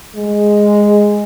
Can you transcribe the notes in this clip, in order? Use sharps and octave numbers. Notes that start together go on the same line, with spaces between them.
G#3